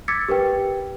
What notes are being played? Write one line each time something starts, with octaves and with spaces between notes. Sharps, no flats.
D6 E6 G#6 A6 B6 C#7
G4 A#4 B4 G5